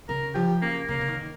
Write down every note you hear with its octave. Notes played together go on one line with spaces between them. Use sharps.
C#3 A#4
F3 G4
C#3 A#3
C#3 A#3
C#3
D#3